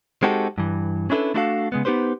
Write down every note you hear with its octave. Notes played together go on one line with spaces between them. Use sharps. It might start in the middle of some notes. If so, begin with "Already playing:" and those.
G#3 C4 D#4 F#4 G4 A4
G2 E3
C#4 D4 E4 G#4 A4 B4
A3 D4 E4 F#4 A4 F5
C#3 G#3 B3
B3 D#4 G4 B4 C5